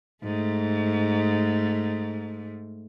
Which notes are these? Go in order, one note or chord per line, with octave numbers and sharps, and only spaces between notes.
G#2 A3